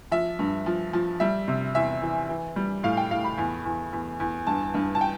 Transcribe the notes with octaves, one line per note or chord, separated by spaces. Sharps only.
F3 E5
G2
F3
F3
G3 E5
C3
E2 E5
E3
E3
G3
A2 F5
G5
A2 F5
B5
E2
E2
E2
E2
G2 A5
G2
A5
G5